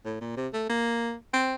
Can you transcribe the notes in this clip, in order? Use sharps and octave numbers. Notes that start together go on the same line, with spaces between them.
A2
A#2
C3
A3
A#3
C4